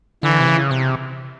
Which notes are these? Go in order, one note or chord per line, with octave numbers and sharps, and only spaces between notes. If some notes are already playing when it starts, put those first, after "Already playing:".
D3 E3
C3
C#3
C3